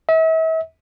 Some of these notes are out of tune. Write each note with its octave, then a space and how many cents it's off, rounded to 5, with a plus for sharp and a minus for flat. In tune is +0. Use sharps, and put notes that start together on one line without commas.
E5 -40